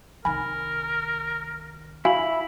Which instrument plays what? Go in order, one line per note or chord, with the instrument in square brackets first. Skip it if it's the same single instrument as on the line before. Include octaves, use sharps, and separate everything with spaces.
[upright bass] C2 D#3 [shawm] A#4 [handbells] G#5 B5
[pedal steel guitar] E4 B5 [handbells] F#4 F5 G#5